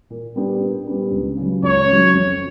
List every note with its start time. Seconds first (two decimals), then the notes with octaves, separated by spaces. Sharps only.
0.10 A#2
0.35 G3 B3 D4 G4
0.61 A#2
0.86 G3 B3 D4 G4
1.12 C#2
1.37 C#3 F#3
1.62 C#2 C#5
1.88 C#3 F#3
2.13 F2